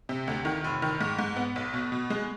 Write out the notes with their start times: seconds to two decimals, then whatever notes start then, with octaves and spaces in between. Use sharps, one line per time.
0.09 C3
0.28 D2
0.45 D#3
0.64 F1
0.82 D#3
1.01 G#2
1.19 G#2
1.36 B3
1.56 B1
1.74 B2
1.92 B2
2.10 G#3